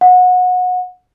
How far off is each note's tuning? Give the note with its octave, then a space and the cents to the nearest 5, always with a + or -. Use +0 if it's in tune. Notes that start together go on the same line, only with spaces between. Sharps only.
F#5 -25